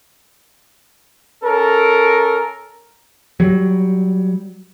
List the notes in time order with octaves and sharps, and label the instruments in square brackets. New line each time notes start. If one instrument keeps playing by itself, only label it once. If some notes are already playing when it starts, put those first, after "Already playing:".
[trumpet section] C#4 A4 A#4
[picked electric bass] F#3 G3